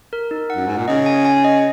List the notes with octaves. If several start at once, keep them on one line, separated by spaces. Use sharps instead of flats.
A#4
D#4
F#5
F#2
G#2 D#4
A#2
C#3 D#5
G#5
G#5
D#5